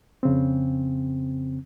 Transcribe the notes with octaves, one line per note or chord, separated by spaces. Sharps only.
F2 C#3 C4